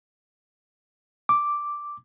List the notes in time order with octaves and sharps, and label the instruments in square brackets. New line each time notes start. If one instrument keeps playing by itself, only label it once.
[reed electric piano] D6